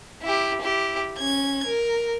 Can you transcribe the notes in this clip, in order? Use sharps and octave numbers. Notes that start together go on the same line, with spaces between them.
E4 G4
E4 G4
C#4 G#6
A#4